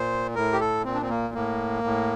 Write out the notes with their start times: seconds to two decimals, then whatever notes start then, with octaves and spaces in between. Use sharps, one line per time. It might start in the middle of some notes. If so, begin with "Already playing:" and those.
Already playing: A#2 C5
0.35 A2 A#4
0.53 G4
0.60 A4
0.84 A#2 C4
0.94 D4
1.02 C4
1.09 A#3
1.34 A2 A#3
1.84 A2